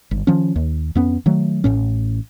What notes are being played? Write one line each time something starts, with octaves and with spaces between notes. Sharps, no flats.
G1
D#3 F3 C#4
D#2
F2 B3 C#4
D#3 F#3 A3
A1 A2 C#4